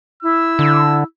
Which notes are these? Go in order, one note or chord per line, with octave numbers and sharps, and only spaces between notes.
E4 E6
D3